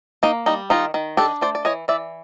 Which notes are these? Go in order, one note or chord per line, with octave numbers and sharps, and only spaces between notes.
A#3 D#4
G3 D#4
D#3 D#4 F4
D#3
D4 G4 A4
A3 C5 D5
D5
E3 C#5 D#5
E3 D5 E5